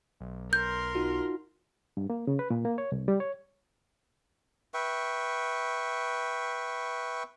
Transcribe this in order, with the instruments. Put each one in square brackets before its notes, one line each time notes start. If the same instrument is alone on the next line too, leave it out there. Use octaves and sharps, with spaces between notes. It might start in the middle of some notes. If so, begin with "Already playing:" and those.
[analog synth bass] B1
[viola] A#4 C6 [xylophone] G6
[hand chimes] D#4 F4 F#4
[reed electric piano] G2
A#3
C#3
B4
A#2
A#3
C#5
C2
G3
C#5
[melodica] B4 E5 G5 C#6